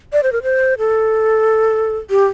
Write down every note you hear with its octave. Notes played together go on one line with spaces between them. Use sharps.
D5
C5
A#4
C5
A4
G4